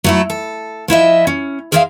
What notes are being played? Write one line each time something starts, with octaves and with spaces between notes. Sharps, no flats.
F#3 A3 E4
A4
F3 E4 D#5 E5
C#4
G#4 A#4 C5 C#5 E5 F5